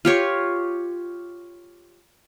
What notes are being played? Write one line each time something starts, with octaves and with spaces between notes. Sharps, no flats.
F4 G4 C#5